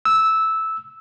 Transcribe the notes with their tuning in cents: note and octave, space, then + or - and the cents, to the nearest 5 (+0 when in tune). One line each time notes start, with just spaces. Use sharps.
E6 -10